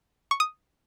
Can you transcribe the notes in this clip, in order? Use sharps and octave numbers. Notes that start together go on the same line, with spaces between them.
C#6
D#6